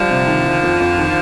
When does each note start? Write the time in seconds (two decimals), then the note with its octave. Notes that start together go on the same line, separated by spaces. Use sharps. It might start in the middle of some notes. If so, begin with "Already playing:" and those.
Already playing: D3 F3 G3
0.10 C3
0.27 D#3
0.46 D#3
0.63 F2
0.80 F2
0.98 D#3